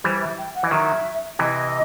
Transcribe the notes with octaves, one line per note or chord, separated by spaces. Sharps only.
E3 G3 C5
E5
G5
F#5
E3 D#5
D#3 F#3 E5
C3 E3 D#5